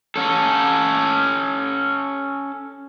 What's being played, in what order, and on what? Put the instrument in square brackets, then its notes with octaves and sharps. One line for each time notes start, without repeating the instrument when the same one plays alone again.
[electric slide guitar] C#4 A4